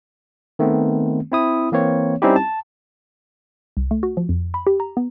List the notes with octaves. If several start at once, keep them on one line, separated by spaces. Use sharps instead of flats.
D#3 A3 B3 C4
C4 E4 D#6
E3 A#3 C4 C#5
G3 C4 C#4 D#4 E4 G4
A5
C2
A3
F#4
F3
F2
B5
G4
A#5
B3